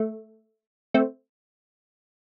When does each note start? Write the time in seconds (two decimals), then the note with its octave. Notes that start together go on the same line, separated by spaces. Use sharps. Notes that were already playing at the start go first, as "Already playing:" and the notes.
Already playing: A3
0.94 A3 C4